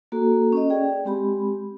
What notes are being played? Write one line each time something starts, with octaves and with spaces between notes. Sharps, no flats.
A#3 F#4 A4
C#4 D#5
G#4 D5 G5
G#3 C4 G4 B5